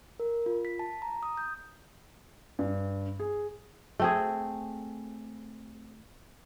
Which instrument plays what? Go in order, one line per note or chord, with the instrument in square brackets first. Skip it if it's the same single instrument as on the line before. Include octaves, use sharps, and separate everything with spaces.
[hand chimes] A#4
F4
B6
A5
A#5
D#6
G6
[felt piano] G2
G#4
[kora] A3 C4 G#4